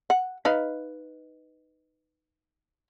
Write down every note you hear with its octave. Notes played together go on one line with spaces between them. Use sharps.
F#5
D#4 B4 F5